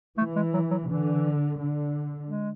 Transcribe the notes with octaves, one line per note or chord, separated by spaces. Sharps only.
E3 A3
G#3
F#3
F#3
D3 E3
D3
G#3